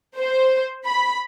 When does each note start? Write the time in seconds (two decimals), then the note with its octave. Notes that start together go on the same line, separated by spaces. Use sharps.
0.18 C5
0.86 B5